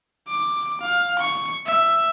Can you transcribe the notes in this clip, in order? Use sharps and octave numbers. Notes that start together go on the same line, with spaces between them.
D6
F5
C#6
E5